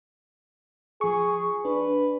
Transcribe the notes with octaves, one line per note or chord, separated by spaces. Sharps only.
F3 G#4 C#6
D4 B4